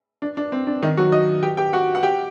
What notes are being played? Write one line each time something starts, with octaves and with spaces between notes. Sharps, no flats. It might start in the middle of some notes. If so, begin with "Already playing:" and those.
D4
D4
C4
D4
D#3 D#4
F#3 F#4
D#4 D#5
G4 G5
G4 G5
F#4 F#5
F#5
G4 G5